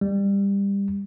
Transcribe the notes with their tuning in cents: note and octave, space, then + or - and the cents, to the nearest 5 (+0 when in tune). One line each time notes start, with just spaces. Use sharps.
G3 +25